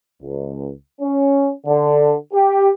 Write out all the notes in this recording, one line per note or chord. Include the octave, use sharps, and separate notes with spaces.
C#2
C#4
D3
G4